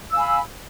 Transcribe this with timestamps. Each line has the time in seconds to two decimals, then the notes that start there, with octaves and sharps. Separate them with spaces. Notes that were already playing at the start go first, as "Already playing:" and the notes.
0.10 E6
0.13 F5
0.16 G#5
0.19 B5